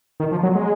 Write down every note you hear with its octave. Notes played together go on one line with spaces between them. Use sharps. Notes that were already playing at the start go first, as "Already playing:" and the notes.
D#3
F3
F#3
G#3